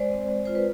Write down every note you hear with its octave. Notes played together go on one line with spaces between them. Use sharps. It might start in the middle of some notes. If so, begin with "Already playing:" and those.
Already playing: G#3 C5 D5
C4
G#3
F4 C5
B4